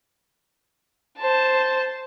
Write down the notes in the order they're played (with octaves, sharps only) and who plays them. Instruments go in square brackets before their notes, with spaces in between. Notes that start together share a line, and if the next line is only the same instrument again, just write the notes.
[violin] C5 A5